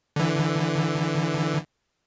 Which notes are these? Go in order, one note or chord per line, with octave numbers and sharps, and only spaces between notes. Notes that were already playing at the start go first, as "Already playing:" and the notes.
D3 E3